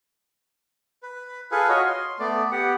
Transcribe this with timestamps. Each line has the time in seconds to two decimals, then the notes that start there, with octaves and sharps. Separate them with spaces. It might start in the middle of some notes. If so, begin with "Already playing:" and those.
1.03 B4
1.51 F4 G#4 A4 B4
1.69 F4 F#4 C#5 D#5
1.85 C6
2.19 A3 B3 D5
2.52 B3 G4 F#5